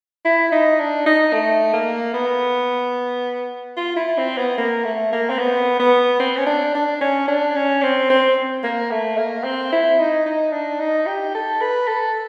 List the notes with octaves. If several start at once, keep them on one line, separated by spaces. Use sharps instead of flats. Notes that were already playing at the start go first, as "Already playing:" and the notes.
E4
D#4
D4
D#4
A3
A#3
B3
F4
E4
C4
B3
A#3
A3
A#3
C4
B3
B3
C4
C#4
D4
D4
C#4
D4
C#4
C4
C4
A#3
A3
A#3
C4
E4
D#4
D#4
D4
D#4
G4
A4
B4
A4